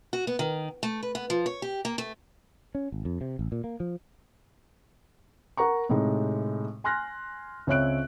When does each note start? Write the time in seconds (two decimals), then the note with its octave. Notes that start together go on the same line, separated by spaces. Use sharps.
0.13 F#4
0.27 B3
0.39 D#3
0.83 A3
1.03 B4
1.15 B3
1.30 F3
1.46 C#5
1.62 G4
1.85 A#3
1.98 A3
2.75 C#4
2.92 G#1
3.05 F2
3.21 C3
3.39 A1
3.52 A#2
3.64 A#3
3.80 F3
5.57 A#4 F#5 A#5 C#6
5.89 A2 C3 G#3 D#4
6.84 G#5 C6 F6 F#6 A#6
7.67 C#2 C4 C#5 E5 F#6 D7